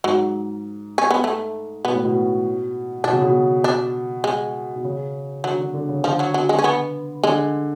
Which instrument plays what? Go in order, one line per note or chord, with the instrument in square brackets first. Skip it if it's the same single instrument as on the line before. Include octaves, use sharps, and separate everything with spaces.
[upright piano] G#2 [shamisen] F#3
[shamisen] C#4
B3
A3
[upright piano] B2 [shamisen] B3
[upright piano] A2
B2
[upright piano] B2 [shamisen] D4
[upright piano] C#3
B2
[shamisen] D4
G#3
[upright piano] B2
C#3
[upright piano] D3 [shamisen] F#3
[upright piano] D3
D3
C#3
[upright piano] D3 [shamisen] F3
[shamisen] F#3
F#3
G#3
C#4
B3
[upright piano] D3 [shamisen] G#3